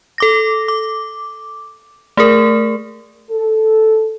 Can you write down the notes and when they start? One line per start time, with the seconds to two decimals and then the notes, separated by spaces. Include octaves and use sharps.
0.18 A4 D6 A#6
0.68 D6
2.17 A3 G#4 A#4
3.30 A4